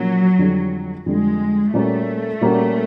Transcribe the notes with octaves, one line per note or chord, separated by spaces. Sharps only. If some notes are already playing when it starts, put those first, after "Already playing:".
Already playing: A#2 F3 F#3 A#3 C#4
F2 D3 G3
F2 D3 G3 G#3
A#2 G3 A3 A#3 C#4 F#4
A#2 G3 A#3 C#4 F#4